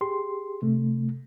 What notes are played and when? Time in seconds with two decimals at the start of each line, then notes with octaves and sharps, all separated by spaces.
0.01 G4 G#4 C6
0.62 C3 A3